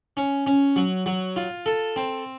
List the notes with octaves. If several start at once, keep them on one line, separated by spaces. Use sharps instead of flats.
C#4
C#4
F#3
F#3
F4
A4
C4